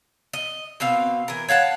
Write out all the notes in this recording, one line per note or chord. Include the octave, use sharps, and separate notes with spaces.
D#5
B2 C4 F5
E3 A#4
C#5 F5 F#5 A5